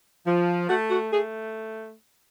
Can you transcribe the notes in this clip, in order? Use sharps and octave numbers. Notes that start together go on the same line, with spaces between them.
F3
A3 F#4
F#4
A3 G#4